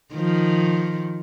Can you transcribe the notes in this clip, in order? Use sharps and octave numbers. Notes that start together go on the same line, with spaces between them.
D#3 F3